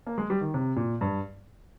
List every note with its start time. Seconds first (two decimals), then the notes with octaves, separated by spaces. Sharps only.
0.07 A#3
0.18 G#3
0.30 G3
0.41 D#3
0.54 C3
0.76 A#2
1.01 G2